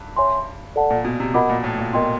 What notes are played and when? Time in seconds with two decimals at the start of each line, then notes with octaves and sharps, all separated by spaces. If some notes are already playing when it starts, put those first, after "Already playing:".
Already playing: G2
0.17 C#5 E5 G#5 C6
0.76 A4 D5 F#5 A5
0.90 A#2
1.05 B2
1.20 C3
1.34 B2 A#4 D#5 F#5 B5 D6
1.49 A#2
1.64 A2
1.78 A#2
1.93 B2 A#4 D#5 G5 C6